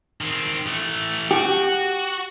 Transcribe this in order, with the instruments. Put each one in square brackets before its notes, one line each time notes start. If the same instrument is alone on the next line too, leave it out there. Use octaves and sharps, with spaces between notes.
[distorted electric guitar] D#3 C4
E3 A3
[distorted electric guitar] F#4 [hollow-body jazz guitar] G4